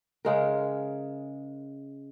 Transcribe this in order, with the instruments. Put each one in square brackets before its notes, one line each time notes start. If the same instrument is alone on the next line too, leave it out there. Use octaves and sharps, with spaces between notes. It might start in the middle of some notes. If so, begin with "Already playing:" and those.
[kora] C#3 G#3 A#4